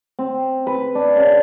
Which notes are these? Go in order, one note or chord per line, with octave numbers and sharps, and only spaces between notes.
C4
B4
D4
C#3